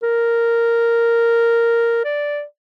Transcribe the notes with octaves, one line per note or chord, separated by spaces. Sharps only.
A#4
D5